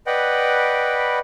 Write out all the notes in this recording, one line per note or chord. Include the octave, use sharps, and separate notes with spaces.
B4 D5 D#5 F#5 G5 B5